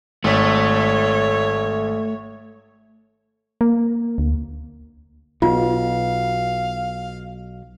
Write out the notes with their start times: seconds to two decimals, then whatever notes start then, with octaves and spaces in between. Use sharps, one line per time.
0.24 G#1 A3 C#5
3.61 A#3
4.18 D2
5.42 B1 B2 F4 F5